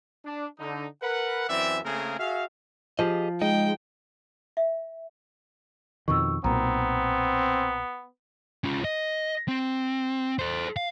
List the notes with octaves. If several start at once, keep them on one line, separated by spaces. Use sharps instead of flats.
D4
D3 D#4
A#4 B4 F#5
F#2 E3 C4 D5 E5
C#3 A3 A#3 C4 G#4 A#4
F#4 G#4 E5 F5
F3 G4 G#4 D#5
G#3 D#4 D#5 G5
E5
F2 B2 D#3 C#6 E6
B1 A#2 B3 C4 A#5
C#4 F4
D#5
C4
A4 C5
F5